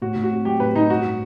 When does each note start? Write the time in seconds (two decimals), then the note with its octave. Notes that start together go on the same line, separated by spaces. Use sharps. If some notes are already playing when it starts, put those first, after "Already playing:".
0.02 A2 F#4
0.16 A2
0.24 F#4
0.31 C4
0.45 F#3 G4
0.60 A2 B4
0.75 A2 D#4
0.89 G2 F#4